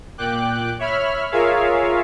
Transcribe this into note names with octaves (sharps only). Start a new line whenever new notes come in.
A#2 G5 D6 F#6
C#5 E5 B5 F6
F4 G#4 A#4 C#5 E5 F5